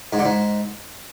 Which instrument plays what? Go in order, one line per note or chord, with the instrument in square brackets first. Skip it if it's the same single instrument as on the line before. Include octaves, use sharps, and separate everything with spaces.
[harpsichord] G#2
D3
G#2